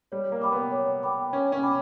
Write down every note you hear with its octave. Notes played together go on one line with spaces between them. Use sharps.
G3 C#5
A#3
G5 B5 D6
B3
C#5
G5 B5 D6
C#4 C#5
C#4
G5 B5 D6